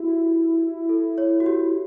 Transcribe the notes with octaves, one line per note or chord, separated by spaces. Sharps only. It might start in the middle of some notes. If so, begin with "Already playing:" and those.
Already playing: E4 F#4 G4
A4
C#5
F#4
G4